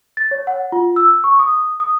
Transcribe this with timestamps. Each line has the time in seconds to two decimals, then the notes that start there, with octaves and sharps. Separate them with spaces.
0.17 A6
0.31 C#5
0.47 F#5
0.72 F4
0.96 E6
1.24 C#6
1.39 D#6
1.80 D#6